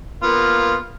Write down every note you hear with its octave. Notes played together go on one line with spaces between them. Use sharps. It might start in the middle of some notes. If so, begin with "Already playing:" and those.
A#3 B3 F4